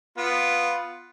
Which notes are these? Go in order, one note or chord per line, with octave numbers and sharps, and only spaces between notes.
B3 F4